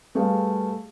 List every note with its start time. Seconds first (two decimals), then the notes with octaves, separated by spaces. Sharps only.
0.15 G3 A3 G#4 B4 F5